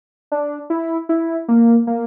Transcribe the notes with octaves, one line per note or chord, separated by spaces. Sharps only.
D4
E4
E4
A#3
A#3